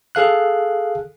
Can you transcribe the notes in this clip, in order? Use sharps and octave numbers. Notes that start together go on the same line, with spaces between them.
G#4 A4 F5 F#6